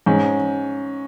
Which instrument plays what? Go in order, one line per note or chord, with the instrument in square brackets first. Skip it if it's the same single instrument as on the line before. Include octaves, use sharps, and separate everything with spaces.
[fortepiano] G#2 [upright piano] C#4